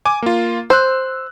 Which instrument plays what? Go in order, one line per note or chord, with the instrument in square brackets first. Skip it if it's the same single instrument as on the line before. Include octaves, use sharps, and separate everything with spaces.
[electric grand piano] G#5 D6
A#3 F4
[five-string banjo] C5 [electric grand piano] E6 F#6